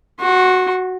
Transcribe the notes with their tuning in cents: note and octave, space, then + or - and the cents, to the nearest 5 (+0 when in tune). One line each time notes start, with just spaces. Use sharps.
F#4 +0 C6 +45